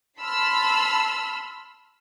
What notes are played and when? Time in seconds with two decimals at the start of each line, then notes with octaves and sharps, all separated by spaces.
0.18 A5 B5 C6 E6 F6